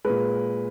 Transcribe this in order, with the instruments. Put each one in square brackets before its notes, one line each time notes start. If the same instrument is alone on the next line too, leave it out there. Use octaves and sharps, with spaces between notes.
[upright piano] A#2 G#3 B4